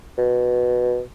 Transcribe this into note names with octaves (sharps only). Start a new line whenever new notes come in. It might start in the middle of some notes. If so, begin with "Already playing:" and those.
B2